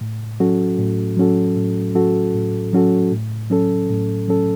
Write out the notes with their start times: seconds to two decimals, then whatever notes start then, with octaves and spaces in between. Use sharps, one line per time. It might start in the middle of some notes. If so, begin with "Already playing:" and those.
0.01 A2
0.40 F#3 C#4 F#4 A4
0.78 A2
1.17 F#3 C#4 F#4 A4
1.56 A2
1.95 F#3 C#4 F#4 A4
2.34 A2
2.73 F#3 C#4 F#4 A4
3.12 A2
3.50 F#3 C#4 A4
3.90 A2
4.28 F#3 C#4 A4